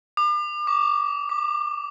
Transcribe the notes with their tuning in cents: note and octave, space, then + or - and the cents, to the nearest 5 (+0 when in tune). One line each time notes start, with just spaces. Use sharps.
D6 +40
D6 -30
D6 -5